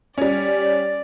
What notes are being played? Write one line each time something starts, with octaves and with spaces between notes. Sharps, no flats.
G3 C#4 D5